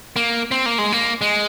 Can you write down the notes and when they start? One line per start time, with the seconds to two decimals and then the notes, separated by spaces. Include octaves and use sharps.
0.16 A#3
0.51 C4
0.66 A#3
0.78 G#3
0.92 A#3
1.21 G#3